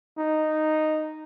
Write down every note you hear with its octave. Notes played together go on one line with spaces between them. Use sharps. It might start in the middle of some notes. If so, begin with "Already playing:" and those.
D#4